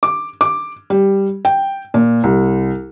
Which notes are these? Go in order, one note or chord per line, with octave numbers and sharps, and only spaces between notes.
D6
D6
G3
G5
A#2
C2